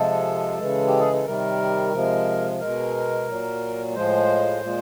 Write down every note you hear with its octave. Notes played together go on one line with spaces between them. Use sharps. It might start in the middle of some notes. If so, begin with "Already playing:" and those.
Already playing: C3 F3 G#3 A4
C#3 E3 G#3
G4
G#4
A4
C3 D#3 G3 A#4
C3 F3 G#3
B2 G#3 A#4
A#2 F#3
A2 F3 G#3 C5
A#2 F3 G#3